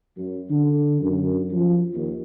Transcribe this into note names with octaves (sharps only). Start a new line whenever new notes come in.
F#2
D3
F#2
F3
D#2